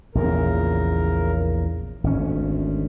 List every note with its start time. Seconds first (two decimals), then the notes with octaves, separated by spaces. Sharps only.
0.15 A#1 E2 A#2 C#3 A#4
2.04 G#1 D2 C#4